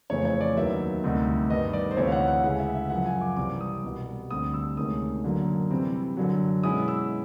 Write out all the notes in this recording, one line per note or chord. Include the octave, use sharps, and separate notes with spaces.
F2 C#3 E3 A3 C#5
C#5
D5
D#2 D#3 F#3 B3 E5
D2 C3 D#3 G3
G2 D#3 G3 B3 D#5
D5
C5
D2 C3 E3 A3 C#5
F5
F#5
F#5
D2 C#3 E3 G#3 F#5
E5
E5
F#2 C#3 F3 F#5
G#5
D6
C2 C3 E3 G3 C4 D6
D#6
C2 B2 G3
D2 D3 G3 C4 D#6
E6
D2 C3 D#3 G#3 C#4 D#6
F#2 D3 F#3 A#3
C3 E3 G3 C4 E4
F#2 D3 F#3
B2 G#3 C#4 E4 D#6
E6